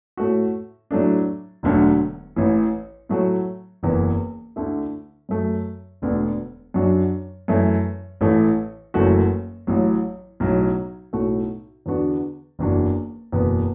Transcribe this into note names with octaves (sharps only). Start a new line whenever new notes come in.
A2 A3 F#4
A2 F#3 A3 D4
E1 D2 D3 F#3 A3
A1 A2 E3
A2 F#3 A3 F#4
F#1 E2 E3 B3
D2 D3 A3 E4
F#2 F#3 A3 F#4
E1 D2 D3 B3
F#2 F#3 D4 F#4
F#2 E3 A3 E4
A1 A2 E3 A3
F#1 F#2 E3 A3 F#4
A1 A2 F#3
B1 A2 F#3
B1 A2 A3 F#4
E2 D3 B3 D4 F#4
F#1 E2 E3 D4 F#4
F#1 E2 B2 B3